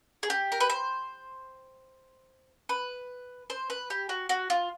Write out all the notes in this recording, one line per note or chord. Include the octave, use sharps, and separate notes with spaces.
G#4
G4
A#4
B4
C5
B4
C5
B4
G4
F#4
F#4
F4